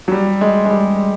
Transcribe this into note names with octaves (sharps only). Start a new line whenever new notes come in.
F#3
G3
G#3
G#3
G3